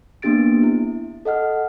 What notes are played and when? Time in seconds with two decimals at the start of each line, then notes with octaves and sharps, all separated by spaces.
0.22 A#3 B3 D4 G4 A6 D7
0.63 E4
1.25 A4 D#5 F#5 F6